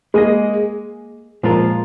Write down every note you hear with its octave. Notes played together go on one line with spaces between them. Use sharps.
G#3 A#3 G#4 D#5
A#2 F3 G#3 F4 A#4